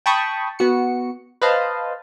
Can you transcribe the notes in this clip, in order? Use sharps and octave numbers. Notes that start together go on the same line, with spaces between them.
G5 A5 B5 C#6 D#6
B3 F#4 C#7
B4 C5 D#5 F5 A5